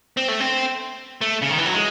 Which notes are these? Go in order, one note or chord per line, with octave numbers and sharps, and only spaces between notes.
C4
A3
C4
A3
C#3
D#3
E3
F#3
G#3